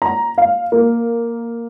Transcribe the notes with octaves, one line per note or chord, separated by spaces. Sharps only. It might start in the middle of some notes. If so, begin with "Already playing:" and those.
A#5
F5
A#3